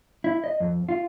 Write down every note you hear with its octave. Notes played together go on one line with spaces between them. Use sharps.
E4
D#5
F2
F4